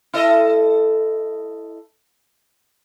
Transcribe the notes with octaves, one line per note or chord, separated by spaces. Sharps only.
E4 A4 D#5